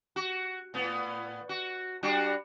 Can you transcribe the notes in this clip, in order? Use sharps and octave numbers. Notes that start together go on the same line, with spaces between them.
F#4
A2 B3
F#4
G3 D4 F#4